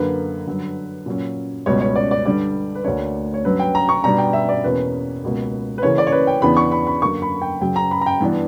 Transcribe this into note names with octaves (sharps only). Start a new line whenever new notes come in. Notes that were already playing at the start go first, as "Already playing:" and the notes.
Already playing: F#2 D3 A#3 B4
G2 D3 F#3
A#2 F#3 C#4
C#2 B2 G3 C#4 C#5
C#5
D5
D5
G2 D3 G3 D5
B4
D2 D3 A#3 D4 C#5
C#5
G2 F#3 C#4 B4
G5
A#5
C#6
B2 G3 B3 D4 A#5
G5
E5
D5
E2 B2 A#3 C#4 B4
C#2 B2 A#3 C#4
B4
C#3 E3 A#3 C#4 C#5
D5
C#5
B4
G5
E2 C#3 E3 B3 D4 B5
C#6
B5
B5
F#2 D3 A#3 C#6
B5
G5
F#2 C#3 F#3 G5
A#5
B5
A#5
G5
G2 E3 B3 D4